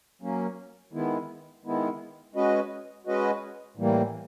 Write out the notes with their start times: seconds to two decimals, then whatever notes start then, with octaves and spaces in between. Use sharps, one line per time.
0.22 F#3 A#3 C#4
0.93 D#3 G#3 B3 E4
1.65 D#3 G#3 B3 E4
2.35 G#3 C#4 F#4 B4 D#5
3.06 G#3 C#4 F#4 B4 D#5
3.77 A2 E3 G3 A#3